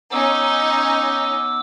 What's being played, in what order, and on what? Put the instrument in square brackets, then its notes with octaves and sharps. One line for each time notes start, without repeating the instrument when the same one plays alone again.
[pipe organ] B3 D6 E6 [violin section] C#4 D#4